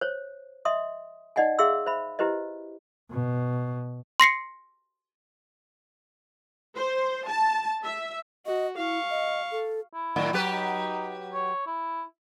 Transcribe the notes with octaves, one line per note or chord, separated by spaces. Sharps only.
C5 C#5
D#5 E5 C6 D#6
D#4 D5 D#5 F#5 G#5
G#4 E5 F5 C6 E6
C5 E5 B5
E4 G4 B4 C5 D#5
B2
C6 A#6 C7 C#7
C5
A5
E5
F#4 D#5
E4 F5 C#6
D#5
A4
E4
A2 D#3 F#3
F#3 G4 B4
D#4
C#5
E4